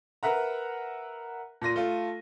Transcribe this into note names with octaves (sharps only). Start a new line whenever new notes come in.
A#4 B4 E5 F#5 A#5
A#2 C6 A#6 D#7
A3 F4